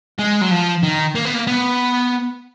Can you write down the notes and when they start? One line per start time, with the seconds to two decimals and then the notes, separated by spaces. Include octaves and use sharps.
0.19 G#3
0.41 F#3
0.51 F3
0.83 D#3
1.15 A#3
1.25 B3
1.35 A#3
1.47 B3